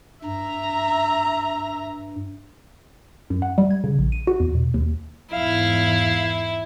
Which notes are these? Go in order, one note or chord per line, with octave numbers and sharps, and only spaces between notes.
G2 E5 A#5
F#2
F#5
G3
G#6
C#3
A#1
D#7
F#4
E2
B2
D#2
E2 G#2 E4 F5